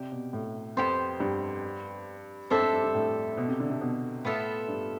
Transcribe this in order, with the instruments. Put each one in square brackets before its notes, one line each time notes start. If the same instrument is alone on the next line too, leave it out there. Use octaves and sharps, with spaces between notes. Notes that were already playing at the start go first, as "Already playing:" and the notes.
Already playing: [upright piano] C3 [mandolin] G4 D5
[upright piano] B2
A2
[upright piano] F2 [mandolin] B3 E4 G4 C5
[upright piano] G2
[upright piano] F2 [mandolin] D4 A4 C5 E5
[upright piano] F2
G2
G2
A2
B2
C3
D3
C3
B2
[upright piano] A2 [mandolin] B3 F4 A4 E5
[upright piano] G2